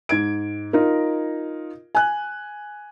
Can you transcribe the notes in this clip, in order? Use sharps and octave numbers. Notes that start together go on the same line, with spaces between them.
G#2 G#6 D7
D#4 F4 A#4
G#5 F#6